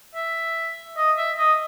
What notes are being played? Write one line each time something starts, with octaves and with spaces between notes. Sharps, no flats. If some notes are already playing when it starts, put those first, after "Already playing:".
E5
D#5
E5
D#5